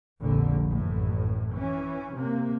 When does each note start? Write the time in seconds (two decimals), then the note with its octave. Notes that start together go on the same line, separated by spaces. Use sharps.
0.21 F1 A#1 D3
0.67 A1 F#2 A2
1.54 E3 C#4
2.15 C3 A#3